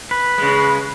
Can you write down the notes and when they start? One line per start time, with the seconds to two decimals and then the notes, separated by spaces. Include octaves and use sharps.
0.11 B4
0.38 C#3 G#3